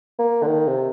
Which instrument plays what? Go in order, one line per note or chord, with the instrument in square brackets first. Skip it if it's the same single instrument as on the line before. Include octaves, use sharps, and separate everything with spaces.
[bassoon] A#3
D3
D#3
C3